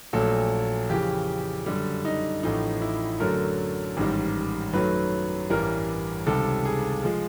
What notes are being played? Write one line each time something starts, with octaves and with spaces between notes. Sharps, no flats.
A#1 A#2 F#3 A3 A4
F2 C#3 E3 G4
F#2 D3 G3
D#4
A1 A2 F3 A3 D#4
E4
F#2 D3 F#3 A3 A#4
A1 G#2 D#3 G3
F#2 D#3 F#3 A3 B4
A1 G2 E3 G3 A#4
C#2 C3 D#3 G3 A4
G#4
F3 G#3